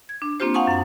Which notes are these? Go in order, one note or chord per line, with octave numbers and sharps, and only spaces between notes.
G#6
D4
A#3 C4 D4 F4 G4 C5
F5 F#5 G#5 A5 C#6 D#6
F#2 F#5